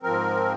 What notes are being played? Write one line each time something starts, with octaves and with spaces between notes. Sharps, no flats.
G#2 F3 C4 A#4